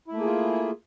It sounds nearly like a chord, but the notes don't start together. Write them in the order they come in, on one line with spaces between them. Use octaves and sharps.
E4 A3 A#3 G#4 F4